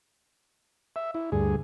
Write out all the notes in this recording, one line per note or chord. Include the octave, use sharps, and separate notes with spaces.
E5
E4
D2 G2 G#4